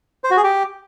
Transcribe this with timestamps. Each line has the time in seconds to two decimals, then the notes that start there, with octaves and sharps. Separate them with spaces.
0.24 C5
0.31 F#4
0.37 G#4
0.44 G4